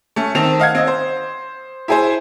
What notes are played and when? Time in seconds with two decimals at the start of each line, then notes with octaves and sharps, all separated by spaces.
0.16 A3 C#4
0.35 D#3 C4 A5 F7
0.60 D#5 F5 F#5 G#6
0.75 C4 D#5
0.87 C5
1.88 E4 G#4 C5